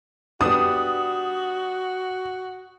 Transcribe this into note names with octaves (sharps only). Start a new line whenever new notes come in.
G3 B3 D4 F#4 D#6